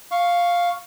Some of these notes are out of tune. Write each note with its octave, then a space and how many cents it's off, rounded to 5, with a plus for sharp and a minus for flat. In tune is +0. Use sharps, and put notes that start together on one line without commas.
F5 +0 C#6 +0